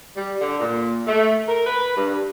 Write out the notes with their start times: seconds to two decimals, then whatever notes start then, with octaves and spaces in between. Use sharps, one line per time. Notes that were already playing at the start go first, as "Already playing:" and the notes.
0.17 G3
0.41 D3
0.60 A#2
1.07 A3
1.48 A#4
1.67 B4
1.97 G2